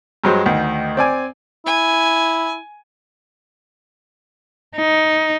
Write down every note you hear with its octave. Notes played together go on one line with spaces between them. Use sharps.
G2 F#3 G#3 C5
D2 D#3
C4 D5 G#5
E4 G#5
D#4